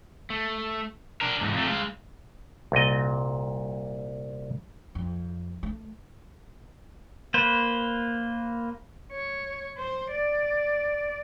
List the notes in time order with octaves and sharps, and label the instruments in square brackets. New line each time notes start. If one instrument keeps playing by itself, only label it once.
[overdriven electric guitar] A3
D4 A#4
E2 G#2
F2 A3
G#3 F5
[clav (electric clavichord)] C2 A#2 D#5
[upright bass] F2
A3
[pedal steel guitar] A#3 B4 C5
[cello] C#5
C5
D5